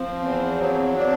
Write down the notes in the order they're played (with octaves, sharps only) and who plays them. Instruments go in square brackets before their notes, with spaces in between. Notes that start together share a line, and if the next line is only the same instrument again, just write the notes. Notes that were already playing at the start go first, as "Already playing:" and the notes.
Already playing: [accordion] F3 [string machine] C4
[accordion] E2
F#3
D4